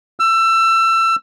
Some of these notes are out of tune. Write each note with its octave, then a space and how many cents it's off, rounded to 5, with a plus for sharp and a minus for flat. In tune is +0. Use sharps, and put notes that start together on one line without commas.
E6 +25